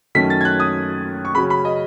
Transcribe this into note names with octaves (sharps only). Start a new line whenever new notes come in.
F#2 D#3 A3 C#4 B6
A6
G#6
F#6
D#6
C#6
C#3 F#3 C#4 B5
B5
D#5